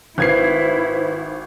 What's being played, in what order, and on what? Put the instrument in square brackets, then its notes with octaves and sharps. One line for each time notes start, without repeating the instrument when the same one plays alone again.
[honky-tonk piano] G#1 G#6 C7 [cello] E4 [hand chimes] B4 C5